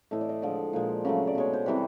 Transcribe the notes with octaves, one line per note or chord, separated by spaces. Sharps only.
A2 E3 A3 D#5
D5
D#5
D3 F3 G#3 D5
A#2 F3 G#3
C#3 F#3 A3
D5
B2 G#3 C#5
C5
C3 E3 G3 B4